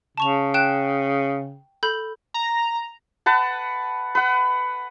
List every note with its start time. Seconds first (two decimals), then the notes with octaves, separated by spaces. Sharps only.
0.18 C#3 A5 C#6 F7
0.54 G5 F#6 E7
1.83 A4 B5 G6
2.34 A#5
3.26 B4 F#5 A5
4.15 B4 F#5